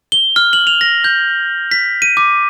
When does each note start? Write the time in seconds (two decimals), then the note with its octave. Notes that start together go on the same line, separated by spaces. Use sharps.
0.12 G7
0.36 F6
0.53 F#7
0.67 F7
0.81 A#6
1.04 G6
1.71 B6
2.02 D#7
2.17 D6